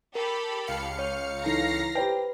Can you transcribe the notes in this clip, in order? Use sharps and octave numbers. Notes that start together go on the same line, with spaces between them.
G4 A4 A#4 B5
C#2 F5 C#7
C#5 F6
E3 D#4 A4 A#5 A#6 C7
G4 B4 C5 G5